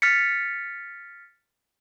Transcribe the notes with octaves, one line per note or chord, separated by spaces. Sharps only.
F6 A6 B6 C#7